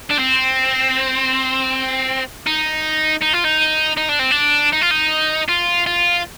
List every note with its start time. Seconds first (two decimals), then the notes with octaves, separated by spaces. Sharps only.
0.11 D4
0.19 C4
2.47 D#4
3.21 D#4
3.33 F4
3.44 D#4
3.97 D#4
4.09 D4
4.19 C4
4.31 D4
4.73 D#4
4.82 F4
4.91 D#4
5.49 F4
5.86 F4